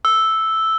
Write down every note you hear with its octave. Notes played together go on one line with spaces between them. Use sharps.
E6